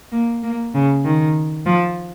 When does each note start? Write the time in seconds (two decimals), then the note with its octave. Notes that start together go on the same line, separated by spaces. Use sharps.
0.12 A#3
0.43 A#3
0.74 C#3
1.05 D#3
1.66 F3